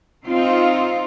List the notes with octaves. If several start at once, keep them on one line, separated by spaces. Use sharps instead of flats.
C4 D#4 F4